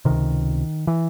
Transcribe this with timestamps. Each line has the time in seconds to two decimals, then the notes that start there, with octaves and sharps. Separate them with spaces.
0.05 C#2 C3 D#3
0.87 E3